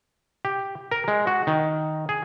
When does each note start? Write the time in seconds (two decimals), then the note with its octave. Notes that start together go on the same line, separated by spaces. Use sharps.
0.45 G4
0.91 A#4
1.08 G#3
1.27 F#4
1.47 D#3
2.09 G#4